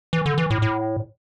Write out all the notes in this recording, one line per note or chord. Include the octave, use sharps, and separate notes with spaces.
E3
D3
E3
A2
A2